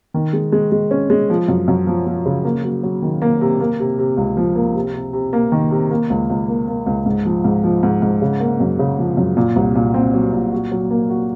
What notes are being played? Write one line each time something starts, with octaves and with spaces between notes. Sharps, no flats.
D#3
G#3
G#3
G#3
C#4
G#3
F3
F#2
F#2
F3
F3
C#3
A#3
F#3
F#3
D#3
A#3
C3
A#3
C3
C3
C#2
F3
A#3
C3
C3
C3
A#3
D#3
C3
A#3
C#2
C#2
A#3
A#3
C#2
G#2
F3
G#2
F3
G#2
G#2
C#3
A#3
F#2
C#3
F3
F#2
A#2
C2
A#2
C4
F#3
A#2
F#4
F#3
A#3
F#4